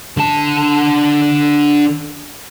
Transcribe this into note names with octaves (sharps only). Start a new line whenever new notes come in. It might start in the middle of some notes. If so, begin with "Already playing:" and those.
D3 A5